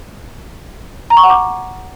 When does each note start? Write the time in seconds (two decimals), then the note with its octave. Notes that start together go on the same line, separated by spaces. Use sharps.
1.10 A#5
1.17 C#6
1.23 F#5
1.30 D6